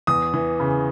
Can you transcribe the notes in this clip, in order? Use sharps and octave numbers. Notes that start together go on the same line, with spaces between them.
E2 D#6
E3
C#3